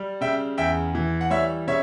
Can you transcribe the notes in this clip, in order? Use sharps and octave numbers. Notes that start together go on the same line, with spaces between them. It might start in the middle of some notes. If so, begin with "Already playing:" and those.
Already playing: G3
C#3 E5 G5
E2 E5 G5
E3
F#5
G3 C#5 E5
C#3 C#5 E5